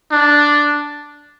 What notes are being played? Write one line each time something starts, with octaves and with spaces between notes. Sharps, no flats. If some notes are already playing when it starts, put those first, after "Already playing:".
D4